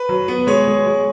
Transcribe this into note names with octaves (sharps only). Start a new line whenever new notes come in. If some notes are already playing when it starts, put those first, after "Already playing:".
Already playing: B4
F#3
B3
G#3 C#5
G#3
G#3